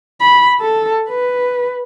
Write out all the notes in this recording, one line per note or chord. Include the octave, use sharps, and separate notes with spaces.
B5
A4
B4